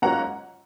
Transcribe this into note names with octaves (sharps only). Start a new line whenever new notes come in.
G#2 F#3 A#3 C#4 F4 F#5 A#5